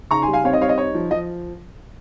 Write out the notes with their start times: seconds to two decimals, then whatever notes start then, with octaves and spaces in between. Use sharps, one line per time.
0.11 C#3 A#5 C#6
0.22 G#5 C6
0.28 G3
0.33 F5 G#5
0.44 C4 C#5 F5
0.53 D#5
0.60 G3 C#5 F5
0.69 D#5
0.78 D#4 C#5
0.95 F3
1.11 F3 D#5